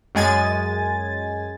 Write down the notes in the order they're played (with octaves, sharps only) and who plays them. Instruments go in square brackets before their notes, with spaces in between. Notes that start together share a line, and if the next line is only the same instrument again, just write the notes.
[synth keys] F#2 G#3 G#5 A6